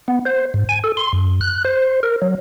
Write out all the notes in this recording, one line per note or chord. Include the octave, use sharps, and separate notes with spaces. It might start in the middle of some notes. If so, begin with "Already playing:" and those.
B3
C5
G#2
G#5
A4
C6
F#2
F#6
C5
A#4
F#3